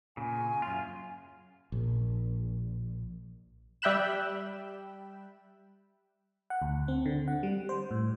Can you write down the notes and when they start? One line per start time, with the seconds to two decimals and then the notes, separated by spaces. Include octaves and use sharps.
0.17 A#2 C#3 G#5
0.62 F#2 F4
1.72 A#1
3.82 G3 E5 G5 B5 F#6 E7
6.50 F#5
6.62 D2
6.88 C4
7.06 D3
7.28 F#5
7.43 G3
7.69 C5
7.91 A2